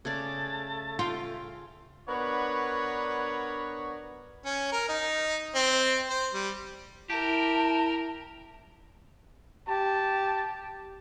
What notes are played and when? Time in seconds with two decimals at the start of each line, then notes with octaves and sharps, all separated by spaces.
0.05 C#3 A3 G#4 D5 A5
0.99 F4 G5
2.08 B3 D4 F#4 A#4 B4 C#5
4.45 C#4
4.72 A#4
4.88 D#4
5.55 C4
6.09 C5
6.34 G3
7.10 E4 G4 A#4 G5 A5
9.68 G4 A5